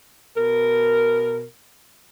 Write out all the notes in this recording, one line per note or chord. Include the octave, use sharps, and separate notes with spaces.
B2 A#4